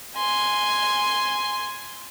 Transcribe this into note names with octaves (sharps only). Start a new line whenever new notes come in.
G#5 C6